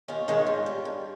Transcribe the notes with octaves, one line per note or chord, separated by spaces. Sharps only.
D#2 C#4 F4
D#3 G#3
G#2
G3
G2